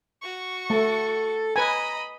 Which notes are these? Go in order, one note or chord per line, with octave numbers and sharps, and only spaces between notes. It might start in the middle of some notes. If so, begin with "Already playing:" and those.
F#4 C#6
A3 A4
B4 D#5 G#5 A#5 B5